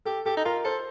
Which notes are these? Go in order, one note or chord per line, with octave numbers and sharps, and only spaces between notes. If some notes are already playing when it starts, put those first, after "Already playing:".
G4 A4
G4 A4
D#4
F4 A#4
A4 C5